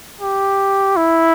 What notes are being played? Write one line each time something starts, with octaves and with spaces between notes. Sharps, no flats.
G4
E4